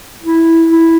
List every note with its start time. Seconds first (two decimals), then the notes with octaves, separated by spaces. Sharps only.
0.23 E4
0.69 E4